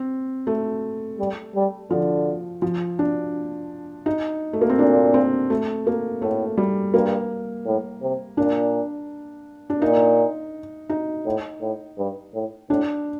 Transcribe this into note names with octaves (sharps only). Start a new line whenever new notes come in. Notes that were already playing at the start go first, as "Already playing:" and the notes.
Already playing: C4
A3
G3
G3
D3 F3
F3
D4
D#4
A3
A#3
C4
A#2 D4
C4
A3
A#3
A2 A3
G3
G2 A#3
A2
C3
A#2 D4
D4
A#2 D#4
D#4
A2
A2
G2
A2
A2 D4